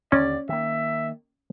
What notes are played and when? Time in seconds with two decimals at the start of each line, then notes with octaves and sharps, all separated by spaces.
0.12 D#2 D3 C#4 D5
0.49 D#3 A#3 E5